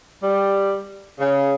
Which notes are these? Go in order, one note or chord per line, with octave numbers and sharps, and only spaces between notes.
G3
C#3